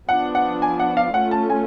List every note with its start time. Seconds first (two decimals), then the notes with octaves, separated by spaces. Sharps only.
0.09 F3 B3 D4 F#5
0.35 F#5
0.62 G#5
0.80 F#5
0.97 F5
1.14 A3 C#4 F4 F#5
1.31 A5
1.50 G#5